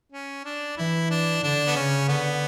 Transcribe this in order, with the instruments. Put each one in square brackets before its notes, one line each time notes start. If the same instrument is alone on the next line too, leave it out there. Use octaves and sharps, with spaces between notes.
[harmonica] C#4
D4
[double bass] E3 [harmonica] E4
[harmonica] D4
[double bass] D3 [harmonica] D4
[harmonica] B3
[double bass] C#3 [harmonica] C#4
[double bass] D3 [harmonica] B3